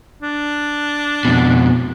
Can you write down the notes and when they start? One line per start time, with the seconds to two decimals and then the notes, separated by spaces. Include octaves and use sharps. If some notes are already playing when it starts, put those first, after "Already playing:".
0.22 D4
1.25 F2 B2